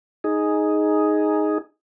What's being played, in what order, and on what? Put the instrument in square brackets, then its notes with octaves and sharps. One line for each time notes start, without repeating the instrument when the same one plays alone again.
[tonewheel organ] D#4 G#4